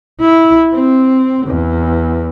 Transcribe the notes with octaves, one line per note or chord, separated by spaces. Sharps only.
E4
C4
E2